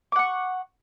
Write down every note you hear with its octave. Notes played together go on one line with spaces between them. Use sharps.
F#5 C#6 D6